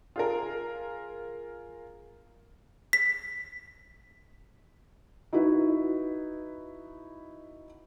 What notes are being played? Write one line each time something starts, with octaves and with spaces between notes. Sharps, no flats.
F4 G#4 A#4
B6
D#4 E4 F#4 B4